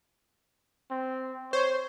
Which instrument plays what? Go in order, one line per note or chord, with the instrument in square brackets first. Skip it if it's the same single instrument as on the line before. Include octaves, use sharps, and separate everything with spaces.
[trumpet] C4
[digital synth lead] C5 [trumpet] C#5